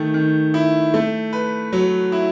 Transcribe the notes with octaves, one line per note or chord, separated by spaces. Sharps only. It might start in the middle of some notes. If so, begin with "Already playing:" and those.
Already playing: D#3 A3
D#3
E4
A3
B4
F#3
E4